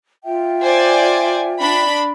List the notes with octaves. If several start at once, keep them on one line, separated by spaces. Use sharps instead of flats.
F4 E5 G5
C5 D5 G#5
D4 B5